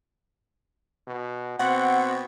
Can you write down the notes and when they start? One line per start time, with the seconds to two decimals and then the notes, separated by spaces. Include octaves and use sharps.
1.07 B2
1.59 B2 C4 F#5